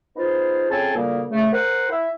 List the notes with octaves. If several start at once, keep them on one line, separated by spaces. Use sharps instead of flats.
B3 D#4 F4 G#4 C5
F2 C#3 C4 C#5 G#5 A5
D2 A#2 C#3 G3 A#3
C#3 A3
A#4 C5 F#5
E4 E5